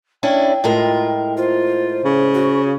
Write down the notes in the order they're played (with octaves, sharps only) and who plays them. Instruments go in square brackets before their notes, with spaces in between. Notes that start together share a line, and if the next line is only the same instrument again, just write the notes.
[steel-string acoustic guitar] C#4 D4 E4 [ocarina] G5
[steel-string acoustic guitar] A2 G#3 A#4 [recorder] F4
[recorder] F4 [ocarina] C5
[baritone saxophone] C#3
[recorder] F#4